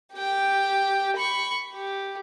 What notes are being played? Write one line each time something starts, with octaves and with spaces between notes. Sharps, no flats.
G4 G5
B5 C#6
G4